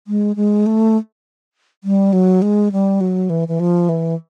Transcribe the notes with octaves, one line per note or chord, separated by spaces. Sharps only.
G#3
G#3
A3
G3
F#3
G#3
G3
F#3
E3
E3
F3
E3